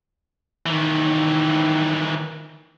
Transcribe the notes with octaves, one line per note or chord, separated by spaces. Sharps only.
D#3 E3